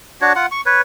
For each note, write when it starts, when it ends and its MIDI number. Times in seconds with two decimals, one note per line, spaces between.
0.21 0.33 62
0.21 0.33 66
0.21 0.33 73
0.35 0.46 65
0.35 0.46 78
0.51 0.61 85
0.66 0.81 71
0.66 0.81 73